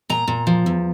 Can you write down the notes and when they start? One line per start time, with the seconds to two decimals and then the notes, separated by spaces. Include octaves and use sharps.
0.09 A#2 A#5
0.28 A#2
0.47 F3
0.66 E2